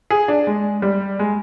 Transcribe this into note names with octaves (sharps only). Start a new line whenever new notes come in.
G#4
D4
G#3
G3
G#3